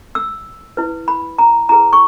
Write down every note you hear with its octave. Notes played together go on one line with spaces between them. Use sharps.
E6
E4 B4
B5
A#5
E4 G#4 B4 A#5
C#6